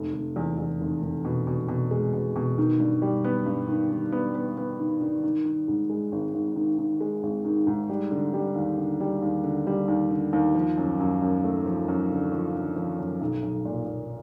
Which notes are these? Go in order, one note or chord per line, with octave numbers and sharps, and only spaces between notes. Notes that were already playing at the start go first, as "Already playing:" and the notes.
Already playing: F1
F1
E2
E2
F1
F1
B2
B2
B2
G#3
B2
B2
D#3
G2
G3
B3
G2
D#3
D#3
B3
B3
B3
D#3
D#3
D#3
D#3
G#2
G#3
G#1
G#1
D#3
D#3
G#3
G#1
D#3
G#2
G3
D3
G3
D#2
D3
G3
D#2
D3
G3
D#2
D3
D#2
F3
F#2
F#2
F#2
A3
F3
F#2
D3
F3
D3
F3
F#2
B1
B1
A#2
A#2